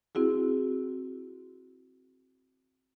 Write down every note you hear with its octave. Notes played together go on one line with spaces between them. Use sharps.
C4 E4 F#4 G#4